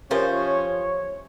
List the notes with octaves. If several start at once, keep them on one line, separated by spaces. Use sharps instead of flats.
F3 C#4 G4 A#4 C5 C#5 E5